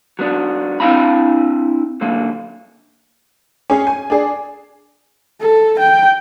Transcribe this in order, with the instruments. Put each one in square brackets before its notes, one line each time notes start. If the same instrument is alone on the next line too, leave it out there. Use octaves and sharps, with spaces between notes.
[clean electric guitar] F#3 B3 D4
C4 D4 E4 F5 A#5 B5
D3 F#3 A#3
[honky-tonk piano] C#4 G#4
G#5
D4 G#4
[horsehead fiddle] A4
G5